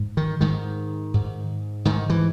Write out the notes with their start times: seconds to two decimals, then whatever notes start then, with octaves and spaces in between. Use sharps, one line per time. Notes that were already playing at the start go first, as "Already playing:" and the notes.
Already playing: G#2
0.17 D#3
0.41 G#2 D#3
1.14 G#2
1.85 G#2 D#3
2.10 E3